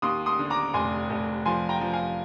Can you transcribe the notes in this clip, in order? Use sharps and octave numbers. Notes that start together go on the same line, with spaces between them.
D#2 C6 D#6
C6 D#6
D3
A#5 D6
F1 G#5 C6
F1
F3 G#5 C6
G5 A#5
F3
F5 G#5